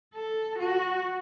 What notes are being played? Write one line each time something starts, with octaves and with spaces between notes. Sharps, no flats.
A4
F#4